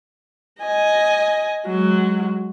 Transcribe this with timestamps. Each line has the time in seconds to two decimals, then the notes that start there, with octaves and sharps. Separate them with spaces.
0.62 D#5 G#5
1.66 F#3 G#3